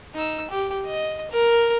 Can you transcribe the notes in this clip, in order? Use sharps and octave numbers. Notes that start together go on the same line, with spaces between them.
D#4 E6
G4
D#5
A#4